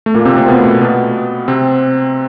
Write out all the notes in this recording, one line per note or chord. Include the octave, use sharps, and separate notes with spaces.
A3
A#2 A#3
C3 C4
C3 C4
B2 B3
A3
A#2 A#3
B2 B3
C3 C4